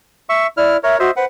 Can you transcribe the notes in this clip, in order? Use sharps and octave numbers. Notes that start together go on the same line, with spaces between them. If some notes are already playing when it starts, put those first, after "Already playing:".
E5 C#6
E4 D5 F6
A#4 C#5 E5
F#4 C5 D#5 E5
B4 C5 F#5